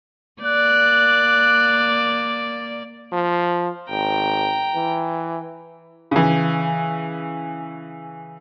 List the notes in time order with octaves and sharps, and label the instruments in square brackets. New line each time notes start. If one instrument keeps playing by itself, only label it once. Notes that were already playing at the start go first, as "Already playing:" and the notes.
[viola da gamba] A#3 D5 [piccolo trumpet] F#6
[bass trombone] F3
[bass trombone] G#1 [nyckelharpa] G5 A#5
[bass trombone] E3
[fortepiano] C#3 E3